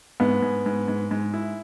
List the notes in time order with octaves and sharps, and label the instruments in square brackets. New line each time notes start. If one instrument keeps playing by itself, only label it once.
[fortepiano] G#2 [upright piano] B3
[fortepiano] G#2
G#2
G#2
G#2
E4